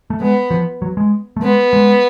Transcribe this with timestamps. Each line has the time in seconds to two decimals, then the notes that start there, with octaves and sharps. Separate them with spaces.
0.10 A3
0.21 G#3 B3
0.51 F3
0.82 F#3
0.97 G#3
1.37 A3
1.42 G#3 B3
1.73 G#3